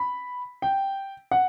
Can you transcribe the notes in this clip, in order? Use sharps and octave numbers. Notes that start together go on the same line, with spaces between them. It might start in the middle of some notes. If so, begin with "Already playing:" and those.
Already playing: B5
G5
F#5